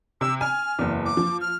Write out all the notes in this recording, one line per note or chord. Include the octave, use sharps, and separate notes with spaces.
C3 E6
G#5 F6
F#1 E2
D6
F3
F6